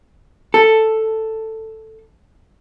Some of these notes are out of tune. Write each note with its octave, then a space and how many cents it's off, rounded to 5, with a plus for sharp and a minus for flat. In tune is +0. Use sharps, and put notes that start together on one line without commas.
A4 +5